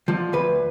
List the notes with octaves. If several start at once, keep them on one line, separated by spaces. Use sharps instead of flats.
D3 F3
D2 B4